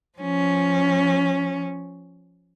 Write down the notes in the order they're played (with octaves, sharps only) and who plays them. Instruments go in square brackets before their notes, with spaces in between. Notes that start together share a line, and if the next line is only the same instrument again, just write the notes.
[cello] F3 C#4